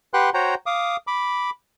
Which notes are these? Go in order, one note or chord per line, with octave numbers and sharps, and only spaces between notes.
G4 B4 F#5 G5 C6 F#6
F#4 C5 C#5 F#5 G5 A#5
F5 D6 D#6
B5 D6